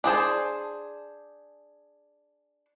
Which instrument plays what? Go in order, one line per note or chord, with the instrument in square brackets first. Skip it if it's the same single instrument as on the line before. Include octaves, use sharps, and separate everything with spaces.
[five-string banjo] D4 G#4 C5 A5